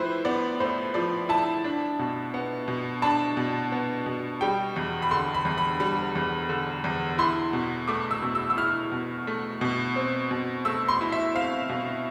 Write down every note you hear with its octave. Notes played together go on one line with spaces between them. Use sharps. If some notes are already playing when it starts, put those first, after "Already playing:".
Already playing: A2 F3 E4 B4 C5
B3 D5
A2 C5
F3 D5
E4 A5
D4
B2
B3
B2
D4 A5
B2
B3
B2
G3 G5
E2
B5
D3 C6
B5
E2
B5
G3 B5
E2
D3
E2
E4 C6
B2
A3 D6
E6
B2
E6
E6
E4 F6
B2
A3
B2
C4
B2
A3 E6
C6
E4
E5
C4 F5
B2